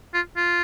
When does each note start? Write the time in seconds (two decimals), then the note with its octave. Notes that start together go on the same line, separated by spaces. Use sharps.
0.14 F4
0.36 F4